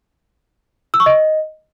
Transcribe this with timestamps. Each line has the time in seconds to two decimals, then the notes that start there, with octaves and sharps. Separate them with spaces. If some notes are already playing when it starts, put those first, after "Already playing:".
0.94 E6
1.00 C#6
1.06 D#5